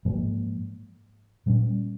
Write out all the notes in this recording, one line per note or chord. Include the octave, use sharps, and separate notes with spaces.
G#2 F3 A#3
A#2 G3 A#3 C#4